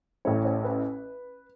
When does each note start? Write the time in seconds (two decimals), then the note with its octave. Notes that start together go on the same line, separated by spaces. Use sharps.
0.25 A1 A2 A3 C#4 C#5
0.45 C#5
0.64 B4